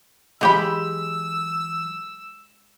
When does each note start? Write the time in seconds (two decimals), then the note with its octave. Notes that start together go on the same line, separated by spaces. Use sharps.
0.41 E3 F#3 G#3 G4 G#4 B5 E6